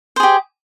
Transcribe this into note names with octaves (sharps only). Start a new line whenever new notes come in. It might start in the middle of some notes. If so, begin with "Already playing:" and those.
G4 G#4 C5